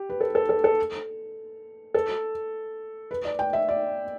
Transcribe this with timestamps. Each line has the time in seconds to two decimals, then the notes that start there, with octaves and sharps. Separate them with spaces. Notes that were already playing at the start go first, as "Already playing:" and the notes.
Already playing: G4
0.10 B4
0.21 A4
0.35 A4
0.49 A4
0.64 A4
1.94 A4
3.11 B4
3.25 D5
3.39 G5
3.53 E5
3.69 D5